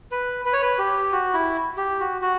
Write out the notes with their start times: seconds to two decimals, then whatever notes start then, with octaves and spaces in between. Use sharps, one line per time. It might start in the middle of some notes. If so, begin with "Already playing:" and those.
0.12 B4
0.45 B4
0.53 C#5
0.62 B4
0.79 G4
1.12 F#4
1.34 E4
1.77 G4
2.00 F#4
2.22 F#4